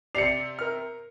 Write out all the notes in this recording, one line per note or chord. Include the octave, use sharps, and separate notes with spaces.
C3 G4 D5 C7 C#7 F7
A#4 F6